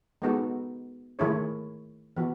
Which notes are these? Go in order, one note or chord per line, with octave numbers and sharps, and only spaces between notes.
G#3 B3 D#4 F#4 A4
D#3 A3 E4 G#4 C#5
E3 B3 F#4